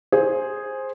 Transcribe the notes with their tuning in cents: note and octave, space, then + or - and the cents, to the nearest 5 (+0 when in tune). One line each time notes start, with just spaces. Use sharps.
G#4 +0 C5 +10